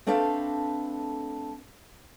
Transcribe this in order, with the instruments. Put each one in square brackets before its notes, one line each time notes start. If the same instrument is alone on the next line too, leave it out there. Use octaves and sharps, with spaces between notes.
[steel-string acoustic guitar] A3 C4 D4 A4 B4 F5